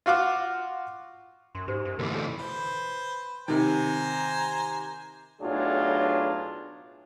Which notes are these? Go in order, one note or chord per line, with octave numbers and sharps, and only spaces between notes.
F4 F#4 F5 D6
F#2 C6
G#2 G4 C5
F#2
D2 B2 E3 A#4 D6
G#4 A4 C#5
B4 C5
C3 D#3 C5 G#5 A#5
B1 A2 F#3 D4 F4 G#4